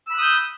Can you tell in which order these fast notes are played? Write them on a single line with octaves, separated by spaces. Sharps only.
E6 B5 F#6 D#6 G6